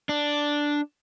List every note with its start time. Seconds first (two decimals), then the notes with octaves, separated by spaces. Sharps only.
0.09 D4